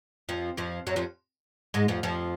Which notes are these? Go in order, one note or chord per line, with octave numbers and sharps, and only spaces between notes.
F2 F3
F2 F3
F#2 F#3
F2 F3
G#2 G#3
F2 F3
F2 F3